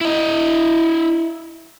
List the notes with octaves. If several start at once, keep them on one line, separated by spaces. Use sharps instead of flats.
E4 D#5